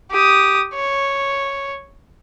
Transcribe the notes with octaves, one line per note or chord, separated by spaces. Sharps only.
G4 D#6
C#5